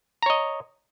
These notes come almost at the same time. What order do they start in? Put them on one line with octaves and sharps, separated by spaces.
A#5 C#5 D#5